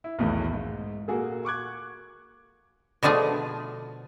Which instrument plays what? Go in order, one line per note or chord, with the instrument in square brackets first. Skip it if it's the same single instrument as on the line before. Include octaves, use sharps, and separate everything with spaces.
[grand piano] E4
B1 E2 A2 D#3 E3
G#2
A#2 A#3 F#4 G#4 A4
C#6 D6 F#6 G#6
[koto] B2 D3 F3 A3 G#4